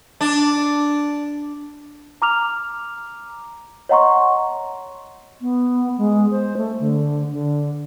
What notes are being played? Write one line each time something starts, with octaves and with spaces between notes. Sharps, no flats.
D4
A#5 D6 F6 F7
C#5 D#5 F#5 A#5 C6 C#6
B3
G#3
C5
A3
D3
D3